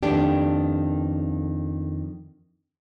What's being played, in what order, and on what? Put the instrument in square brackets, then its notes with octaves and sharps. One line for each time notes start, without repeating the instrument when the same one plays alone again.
[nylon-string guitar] F2 D#3 A3 B3 D4 G4